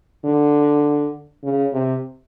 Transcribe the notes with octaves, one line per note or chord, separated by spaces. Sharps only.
D3
C#3
C3